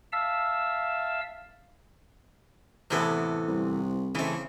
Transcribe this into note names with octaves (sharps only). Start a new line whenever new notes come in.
E5 F5 A5 E6
A2 C3 E3 B3 A4
C2
C#3 E3 A3 C4